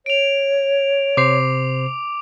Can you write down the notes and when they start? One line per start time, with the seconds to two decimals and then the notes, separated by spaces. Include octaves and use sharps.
0.06 C#5 D7 F7
1.17 C3 C5 D6 C7